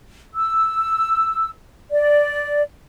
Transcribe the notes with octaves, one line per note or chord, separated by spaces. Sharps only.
E6
D5